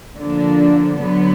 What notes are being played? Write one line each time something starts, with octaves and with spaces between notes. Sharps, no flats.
D3 F3 A#3 D4
D3 F#3 B3